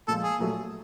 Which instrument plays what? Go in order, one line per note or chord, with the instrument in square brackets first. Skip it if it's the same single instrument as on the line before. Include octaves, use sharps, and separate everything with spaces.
[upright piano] A#2 F3 G#3 [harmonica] A4
[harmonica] G#4
[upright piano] A#2 F#3 A3